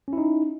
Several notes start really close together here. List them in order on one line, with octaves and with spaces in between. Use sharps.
C#4 E4 D#4